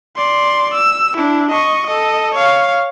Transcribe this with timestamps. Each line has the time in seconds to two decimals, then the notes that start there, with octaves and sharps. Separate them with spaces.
0.17 D5 C6
0.74 E6
1.17 D4 E4
1.51 D#5 C#6
1.87 A4 D#5
2.35 C#5 F5